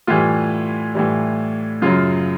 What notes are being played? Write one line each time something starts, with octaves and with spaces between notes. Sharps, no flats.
A2 E3 G3 F4
A2 E3 G3
F#2 C#3 F#3 F4